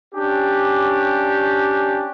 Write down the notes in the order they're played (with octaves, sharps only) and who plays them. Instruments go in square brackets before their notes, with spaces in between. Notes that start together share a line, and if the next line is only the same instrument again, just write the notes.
[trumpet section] C#4 D4 G4